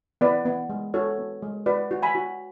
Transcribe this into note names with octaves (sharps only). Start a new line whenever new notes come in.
B3 B4 D5
B3
G#3
F#4 A4 C#5
B3
G#3
F#4 B4 D5
F#4
G#5 B5
F#4